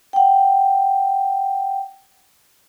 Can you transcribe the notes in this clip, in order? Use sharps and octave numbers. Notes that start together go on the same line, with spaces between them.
F#5 G5